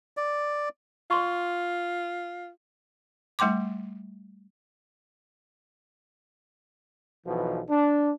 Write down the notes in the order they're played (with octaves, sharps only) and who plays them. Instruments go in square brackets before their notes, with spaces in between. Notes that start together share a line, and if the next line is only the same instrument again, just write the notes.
[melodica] D5
[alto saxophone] F4 [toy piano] D5 C6 C#6
[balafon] G3 A3 G5 C6 D6
[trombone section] B1 B2 E3 F3
D4